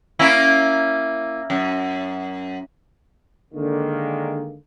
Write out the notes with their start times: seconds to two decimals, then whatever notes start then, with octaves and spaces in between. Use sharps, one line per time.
0.19 A#3 C#4 E4
1.50 F#2
3.54 D3 D#3 G#3 A#3